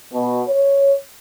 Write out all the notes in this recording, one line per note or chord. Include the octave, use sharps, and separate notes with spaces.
B2
C#5